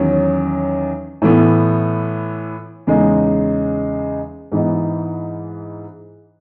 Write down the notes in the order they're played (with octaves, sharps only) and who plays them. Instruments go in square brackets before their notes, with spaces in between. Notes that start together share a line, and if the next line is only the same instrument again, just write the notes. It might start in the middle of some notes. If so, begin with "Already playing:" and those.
Already playing: [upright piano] E2 D#3 F#3 C#4
A2 E3 B3
E2 C#3 G#3 D#4
G#2 E3 B3 D#4